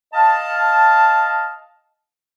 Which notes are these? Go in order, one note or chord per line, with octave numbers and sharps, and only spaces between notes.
D#5 F5 A5